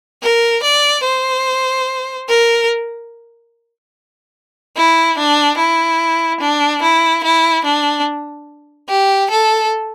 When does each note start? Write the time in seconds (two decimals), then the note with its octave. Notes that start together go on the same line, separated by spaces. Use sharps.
0.23 A#4
0.63 D5
1.04 C5
2.29 A#4
4.77 E4
5.18 D4
5.58 E4
6.40 D4
6.82 E4
7.24 E4
7.65 D4
8.89 G4
9.30 A4